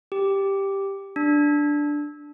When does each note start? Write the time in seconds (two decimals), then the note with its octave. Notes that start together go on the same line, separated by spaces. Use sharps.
0.12 G4
1.16 D4